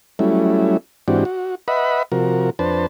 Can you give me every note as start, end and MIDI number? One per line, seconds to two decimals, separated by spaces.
0.19 0.77 54
0.19 0.77 55
0.19 0.77 57
0.19 0.77 61
0.19 0.77 64
1.08 1.24 44
1.08 1.24 52
1.08 1.24 60
1.08 1.24 62
1.08 1.24 66
1.08 1.24 67
1.25 1.55 66
1.68 2.03 71
1.68 2.03 75
1.68 2.03 76
1.68 2.03 78
1.68 2.03 83
2.12 2.50 48
2.12 2.50 53
2.12 2.50 66
2.12 2.50 70
2.59 2.86 41
2.59 2.86 62
2.59 2.86 71
2.59 2.86 72
2.59 2.86 81